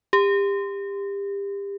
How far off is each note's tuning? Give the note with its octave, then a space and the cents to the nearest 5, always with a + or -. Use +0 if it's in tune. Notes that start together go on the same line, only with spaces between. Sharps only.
G4 +30